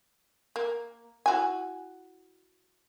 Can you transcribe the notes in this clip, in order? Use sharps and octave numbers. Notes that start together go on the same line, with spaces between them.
A#3
E4 F#4 G#5